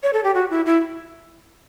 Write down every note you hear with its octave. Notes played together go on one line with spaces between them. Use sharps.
C#5
A4
G4
F#4
E4
E4